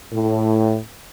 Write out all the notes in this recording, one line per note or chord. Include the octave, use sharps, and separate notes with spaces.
A2